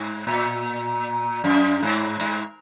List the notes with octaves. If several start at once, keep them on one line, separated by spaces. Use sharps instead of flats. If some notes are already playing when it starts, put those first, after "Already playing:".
Already playing: G#2
A#2
F#2
G#2
G#2